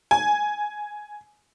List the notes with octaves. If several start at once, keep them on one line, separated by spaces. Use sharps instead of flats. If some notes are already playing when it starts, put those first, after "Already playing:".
G#5